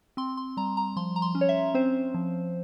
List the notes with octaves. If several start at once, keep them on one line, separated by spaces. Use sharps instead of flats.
C4 C6
C6
G3 A#5
A#5
F3 C6
A#5
C6
C#4
C#5
E5
C4 C5
F3